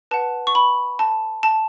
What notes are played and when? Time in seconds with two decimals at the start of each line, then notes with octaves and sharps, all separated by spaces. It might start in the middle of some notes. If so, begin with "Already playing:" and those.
0.11 B4 F#5 A5
0.47 C#6
0.55 B5
0.99 A5
1.43 A5